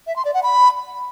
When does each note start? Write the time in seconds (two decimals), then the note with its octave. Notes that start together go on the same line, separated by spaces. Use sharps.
0.07 E5
0.16 C6
0.25 D5
0.34 F#5
0.43 B5